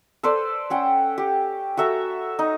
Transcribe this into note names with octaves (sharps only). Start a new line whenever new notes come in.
A4 B4 C5 D5
C#4 F#5 G5
G4
F#4 A4 E5 A#5
D#4